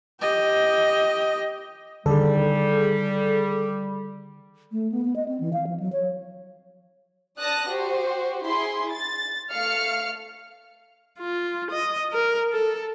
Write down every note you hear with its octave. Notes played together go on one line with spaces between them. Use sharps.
G4 D#5
D3 D#3 G3 G#4 A4
A3
B3
B3
D#5
C4
E3
F5
F3
F#3
C#5
D5 A5 D#6 F#6 A#6
F#4 G4 C5
E4 G#4 C6
A6
A3 F5 F6 C#7
F4
D#5
A#4
A4